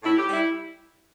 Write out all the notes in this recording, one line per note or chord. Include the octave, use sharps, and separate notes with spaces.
A2 E4
G4
G3 E4